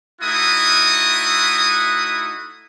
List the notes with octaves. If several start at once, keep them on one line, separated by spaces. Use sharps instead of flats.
A3 D#4 E4 F#4 D#6